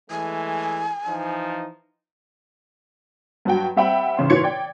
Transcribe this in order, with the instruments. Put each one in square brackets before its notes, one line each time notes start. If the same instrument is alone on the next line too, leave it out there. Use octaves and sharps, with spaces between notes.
[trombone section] E3 G#3 A3 [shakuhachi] G#5
[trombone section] E3 F3 D#4
[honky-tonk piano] G2 F#3 F#4 G5
G3 C4 E5 F#5 G5 B5
A1 C#3 C6
A#2 E3 C#5 C6 G#6 C#7
D5 G5